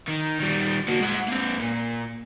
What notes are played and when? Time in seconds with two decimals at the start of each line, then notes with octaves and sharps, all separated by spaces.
0.08 D#3
0.40 D#3 G3
0.88 A#3 F#4
1.00 G#3 F#5
1.28 A#3 C4
1.59 A#2